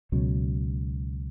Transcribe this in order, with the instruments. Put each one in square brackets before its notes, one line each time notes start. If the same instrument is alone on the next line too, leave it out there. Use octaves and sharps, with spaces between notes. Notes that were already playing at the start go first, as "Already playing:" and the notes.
[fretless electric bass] C#2 B2 F#3 C#4